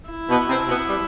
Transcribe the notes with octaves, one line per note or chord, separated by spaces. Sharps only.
E4
B2 B3
C3 C4
B2 B3
G3